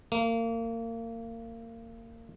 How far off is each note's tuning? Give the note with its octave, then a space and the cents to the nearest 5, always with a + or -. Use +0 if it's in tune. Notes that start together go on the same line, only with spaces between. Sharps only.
A#3 -30